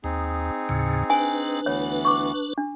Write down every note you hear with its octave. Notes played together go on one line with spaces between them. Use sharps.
D#2 C4 D#4 G#4
D#2 A2 C#3
D4 B4 G#5
D2 E3 B3 C#5
C#6 D6
D4